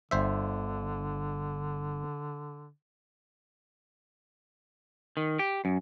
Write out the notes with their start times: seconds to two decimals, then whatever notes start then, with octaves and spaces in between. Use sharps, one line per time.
0.11 G1 D3 C5 E5
5.17 D#3
5.39 G4
5.65 F#2